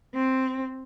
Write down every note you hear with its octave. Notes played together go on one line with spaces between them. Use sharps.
C4